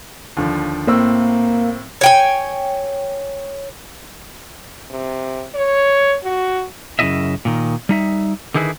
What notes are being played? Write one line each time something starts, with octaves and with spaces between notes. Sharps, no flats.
D#2 D3 F3
A2 A#3 C4 E6
C#5 G5 G#5
C3
C#5
F#4
F#2 C#3 C#4 E4 D#5 E5
A#2 D#3
G3 D#4 E5
D3 D#3 D#4 E4 G#4 B4